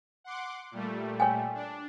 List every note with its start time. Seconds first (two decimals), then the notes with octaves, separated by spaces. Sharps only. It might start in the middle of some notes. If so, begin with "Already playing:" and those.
0.24 F#5 C6 D6
0.71 A#2 G3 A3
1.20 C#5 G5 G#5
1.55 D4